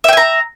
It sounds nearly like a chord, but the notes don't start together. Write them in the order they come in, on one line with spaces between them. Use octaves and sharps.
E5 G5 G#5 A#5